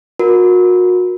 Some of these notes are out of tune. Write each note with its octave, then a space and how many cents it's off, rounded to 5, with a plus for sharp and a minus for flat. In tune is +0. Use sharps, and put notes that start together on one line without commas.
F#4 -35 A#4 +15